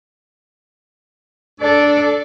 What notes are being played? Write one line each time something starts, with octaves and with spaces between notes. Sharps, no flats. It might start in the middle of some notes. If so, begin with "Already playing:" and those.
D4 A4 D5